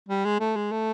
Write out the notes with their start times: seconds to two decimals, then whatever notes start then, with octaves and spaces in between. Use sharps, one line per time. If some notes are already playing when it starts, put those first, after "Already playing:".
0.09 G3
0.25 G#3
0.40 A3
0.56 G#3
0.72 A3